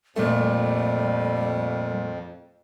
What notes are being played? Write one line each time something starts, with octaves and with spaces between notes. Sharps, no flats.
F2 A#2 G3 A3